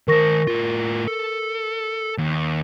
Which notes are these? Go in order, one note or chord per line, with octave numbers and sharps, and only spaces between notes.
D#3 A#4 C5 C#6 A#6
A2 F4
A4
D#2